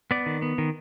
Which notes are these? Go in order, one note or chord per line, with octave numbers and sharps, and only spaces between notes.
B3 D5
D#3
B3
D#3